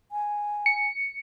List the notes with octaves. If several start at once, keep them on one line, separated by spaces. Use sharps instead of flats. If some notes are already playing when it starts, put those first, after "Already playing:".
G#5
C#7